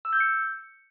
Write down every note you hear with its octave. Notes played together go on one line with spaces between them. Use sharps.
E6
G6
C#7